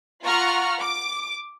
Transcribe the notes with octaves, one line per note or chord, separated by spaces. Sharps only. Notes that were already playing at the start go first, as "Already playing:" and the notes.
F4 F#5 A#5 C#6 F6
D6